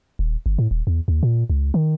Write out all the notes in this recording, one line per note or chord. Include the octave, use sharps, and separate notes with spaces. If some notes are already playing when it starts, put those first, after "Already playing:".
D#1
G1
A2
D#1
E2
D#2
A#2
C#2
D#3